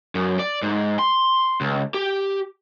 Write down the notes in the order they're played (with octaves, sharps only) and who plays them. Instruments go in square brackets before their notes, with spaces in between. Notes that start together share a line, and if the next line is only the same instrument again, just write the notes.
[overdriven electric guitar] F#2
D5
G#2
C6
C#2
G4